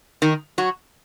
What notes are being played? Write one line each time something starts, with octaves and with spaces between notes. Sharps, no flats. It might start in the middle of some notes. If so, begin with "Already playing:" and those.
D#3 D#4
F#3 F#4